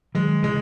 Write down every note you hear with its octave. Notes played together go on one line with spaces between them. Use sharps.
D#3 F#3 G#3
C#3 E3 G#3